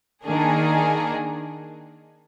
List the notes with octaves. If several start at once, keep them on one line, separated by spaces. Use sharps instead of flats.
D#3 A#3 D4 G#4